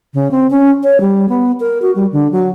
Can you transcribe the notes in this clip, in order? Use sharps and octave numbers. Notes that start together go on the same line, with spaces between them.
C#3
C4
C#4
C#5
G3
B3
A#4
F#4
G3
D3
F#3